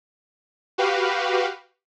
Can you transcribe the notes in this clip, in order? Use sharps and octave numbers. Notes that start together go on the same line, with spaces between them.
F#4 G4 B4 F5